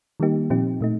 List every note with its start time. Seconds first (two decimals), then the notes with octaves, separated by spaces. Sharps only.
0.20 D#3 G3 A#3 D#4 G4
0.50 A#2 F3 C4 D#4 G4
0.81 A#2 A3 D#4